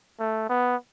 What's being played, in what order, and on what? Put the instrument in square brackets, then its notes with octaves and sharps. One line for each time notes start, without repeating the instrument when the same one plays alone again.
[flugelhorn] A3
B3